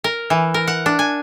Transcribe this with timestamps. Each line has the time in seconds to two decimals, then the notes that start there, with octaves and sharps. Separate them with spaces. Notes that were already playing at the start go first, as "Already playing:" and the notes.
0.04 A#4
0.30 E3
0.54 A#4
0.67 F#5
0.86 D4
0.99 G#5